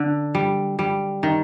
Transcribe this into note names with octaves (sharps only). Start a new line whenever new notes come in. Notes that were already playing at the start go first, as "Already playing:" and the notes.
Already playing: D3
G3
G3
D#3